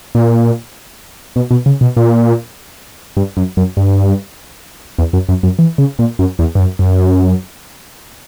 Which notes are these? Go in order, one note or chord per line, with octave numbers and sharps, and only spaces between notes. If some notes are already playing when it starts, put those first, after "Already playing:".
A#2
B2
B2
C#3
B2
A#2
G2
F#2
F#2
G2
E2
F#2
F#2
F#2
E3
C#3
A#2
F#2
E2
G2
F#2
F#2